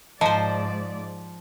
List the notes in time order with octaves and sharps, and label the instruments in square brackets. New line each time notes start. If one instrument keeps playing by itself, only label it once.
[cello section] G#2 D5 [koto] F3 C5 [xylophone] D#5 A5 A#5